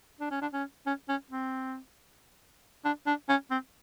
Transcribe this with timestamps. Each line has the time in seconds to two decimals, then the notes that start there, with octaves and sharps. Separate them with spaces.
0.20 D4
0.31 C#4
0.42 D4
0.53 C#4
0.86 C#4
1.09 C#4
1.31 C4
2.85 D4
3.07 D4
3.29 C#4
3.51 C4